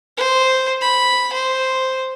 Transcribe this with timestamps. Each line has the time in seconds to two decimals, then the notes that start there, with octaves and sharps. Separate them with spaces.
0.17 C5
0.81 B5
1.33 C5